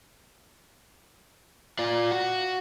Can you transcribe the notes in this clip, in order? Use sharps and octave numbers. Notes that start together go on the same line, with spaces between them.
F4 D5
F#4